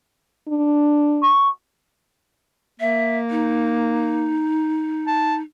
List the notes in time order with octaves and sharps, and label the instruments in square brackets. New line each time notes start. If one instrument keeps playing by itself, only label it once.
[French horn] D4
[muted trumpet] C#6
[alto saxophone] A#3 [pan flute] E5
[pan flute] D#4
[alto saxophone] A5